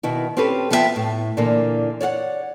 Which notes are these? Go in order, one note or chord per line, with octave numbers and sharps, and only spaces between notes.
B2 D#3 E4
C4 C#4 G4 A4 B4
F3 B3 F4 F#4 E5 G5
A2
A#2 D3 E3 A#3
C#5 D5 F5 F#5